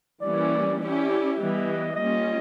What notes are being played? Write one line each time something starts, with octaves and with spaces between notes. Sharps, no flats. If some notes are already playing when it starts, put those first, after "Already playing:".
E3 G3 A#3 C#4 D5
C#4 E4 G4 D5
E3 G3 B3 D#5
G3 A#3 C#4 F4 D#5